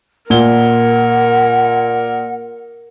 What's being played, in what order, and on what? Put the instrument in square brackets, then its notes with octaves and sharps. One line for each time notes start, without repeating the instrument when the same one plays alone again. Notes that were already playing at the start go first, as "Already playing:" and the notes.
[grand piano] A#2 G7 [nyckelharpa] A#4 [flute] F#5